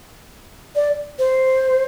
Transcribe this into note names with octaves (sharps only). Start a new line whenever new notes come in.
D5
C5